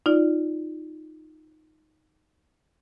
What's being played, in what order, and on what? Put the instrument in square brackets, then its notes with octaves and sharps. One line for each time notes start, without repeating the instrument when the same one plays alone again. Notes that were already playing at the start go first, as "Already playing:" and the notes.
[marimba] D#4 F4 D5